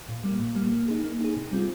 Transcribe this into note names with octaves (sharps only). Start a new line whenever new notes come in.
A#2
G3 A#3
A#2
G3 A#3
A#3
D#4 G#4
A#3
D#4 G#4
C3
G3 C4 F4